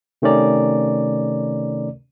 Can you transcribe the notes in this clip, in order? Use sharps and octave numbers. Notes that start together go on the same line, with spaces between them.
C3 D#3 A3 C#4 D5 A#5